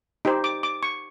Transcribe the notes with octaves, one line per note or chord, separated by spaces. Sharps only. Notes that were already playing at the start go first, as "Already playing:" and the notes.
D#4 G4 C5
D6
D6
C#6